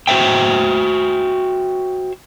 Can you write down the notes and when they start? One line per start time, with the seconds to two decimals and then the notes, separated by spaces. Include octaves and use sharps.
0.07 F#4 C5 E5 G5